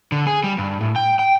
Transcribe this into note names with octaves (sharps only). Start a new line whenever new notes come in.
D3
G#4
G3
G2
A2
G5
G5